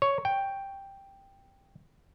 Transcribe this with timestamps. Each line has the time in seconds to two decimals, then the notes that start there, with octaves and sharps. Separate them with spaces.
0.02 C#5
0.25 G5